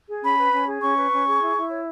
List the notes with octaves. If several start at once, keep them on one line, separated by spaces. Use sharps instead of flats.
G#4
C#4 B5
B4
C#4
G#4
C#4 C#6
B4
C#4
G#4
E4
E4
C#5